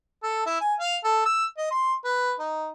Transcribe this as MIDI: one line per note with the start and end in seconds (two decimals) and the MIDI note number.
0.23 0.45 69
0.46 0.56 64
0.61 0.75 80
0.80 0.97 77
1.04 1.23 69
1.26 1.45 88
1.57 1.69 75
1.71 1.93 84
2.05 2.33 71
2.39 2.70 63